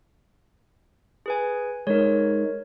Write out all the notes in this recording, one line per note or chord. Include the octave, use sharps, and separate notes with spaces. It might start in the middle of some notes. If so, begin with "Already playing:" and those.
G#4 B4 G#5
G#3 D#4 A#4 C#5